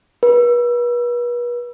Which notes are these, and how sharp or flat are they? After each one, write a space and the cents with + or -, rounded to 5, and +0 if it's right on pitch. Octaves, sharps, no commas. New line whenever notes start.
B4 -40